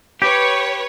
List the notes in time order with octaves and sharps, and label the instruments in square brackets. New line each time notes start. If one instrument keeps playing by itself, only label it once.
[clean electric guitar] G4 [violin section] B4 C#5